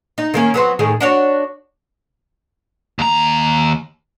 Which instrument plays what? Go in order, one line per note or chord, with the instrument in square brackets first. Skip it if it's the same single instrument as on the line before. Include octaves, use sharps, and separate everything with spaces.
[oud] D#4
D#3 A#3 C#4
F#3 B3 C4
A2 D#3 G#4
D4 F#4 C#5
[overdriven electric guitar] D#2 A#5